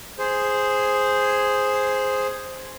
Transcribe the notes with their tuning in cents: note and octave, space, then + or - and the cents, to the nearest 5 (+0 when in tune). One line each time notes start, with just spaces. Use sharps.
G#4 +0 C5 +0